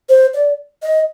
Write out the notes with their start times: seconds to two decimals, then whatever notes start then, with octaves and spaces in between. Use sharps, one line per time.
0.09 C5
0.34 D5
0.83 D#5